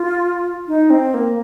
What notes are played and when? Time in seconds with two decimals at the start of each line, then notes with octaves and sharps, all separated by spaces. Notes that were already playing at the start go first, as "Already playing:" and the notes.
Already playing: F4
0.68 D#4
0.90 C4
1.14 A#3